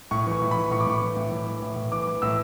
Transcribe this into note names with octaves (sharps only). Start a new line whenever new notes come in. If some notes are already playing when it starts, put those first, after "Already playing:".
A2 C#6
E3 C#6
A2
B5
E3
A2 C#6
D6
A2 C#6
E3
A2
A2
E3
A2
A2
E3 D6
E3
A2 E6